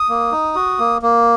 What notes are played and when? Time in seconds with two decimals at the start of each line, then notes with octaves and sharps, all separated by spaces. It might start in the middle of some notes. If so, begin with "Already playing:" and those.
Already playing: D#6
0.09 A#3
0.32 D#4
0.55 F#4
0.79 A#3
1.02 A#3